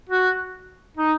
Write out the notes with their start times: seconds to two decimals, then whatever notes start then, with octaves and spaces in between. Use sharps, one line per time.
0.09 F#4
0.97 D#4